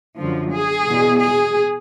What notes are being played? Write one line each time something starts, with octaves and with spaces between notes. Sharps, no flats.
F#2 D3 F3
G#4
E2 B2
G#4